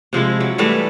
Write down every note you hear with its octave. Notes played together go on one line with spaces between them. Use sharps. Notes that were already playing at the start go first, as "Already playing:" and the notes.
C3 F3 G#3 E4
F#3
E3 G3 A3 B4